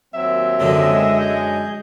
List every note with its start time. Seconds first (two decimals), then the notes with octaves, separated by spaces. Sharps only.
0.14 D#2 F#3 C4 E5
0.60 F#2 D3 G#3 D#5
1.19 G#4 G6